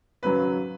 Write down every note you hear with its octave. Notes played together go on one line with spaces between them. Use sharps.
G#1 F#2 C#3 F#3 B4